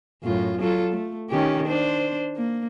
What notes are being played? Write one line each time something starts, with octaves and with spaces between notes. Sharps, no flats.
F#2 A2 F4
F#3 F4 A4
A3
D#3 C#4 G4
D4 C5
A#3